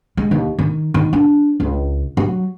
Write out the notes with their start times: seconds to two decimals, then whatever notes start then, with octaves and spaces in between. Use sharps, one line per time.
0.17 G#3
0.31 D#2
0.59 D#3
0.94 D#3
1.13 D4
1.60 C#2
2.17 F#3